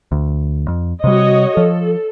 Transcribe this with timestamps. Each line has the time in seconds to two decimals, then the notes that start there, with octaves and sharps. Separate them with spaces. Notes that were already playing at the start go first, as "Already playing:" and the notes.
0.12 D2
0.68 F2
1.04 C3 G3 F#4 C#5 D#5
1.57 F3 A4